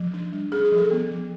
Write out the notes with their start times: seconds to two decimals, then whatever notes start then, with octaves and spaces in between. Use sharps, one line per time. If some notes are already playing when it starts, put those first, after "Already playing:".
Already playing: F3
0.14 D4
0.33 G3
0.52 C#4 G#4
0.65 G#4
0.72 F3
0.78 A4
0.91 B3
1.11 F3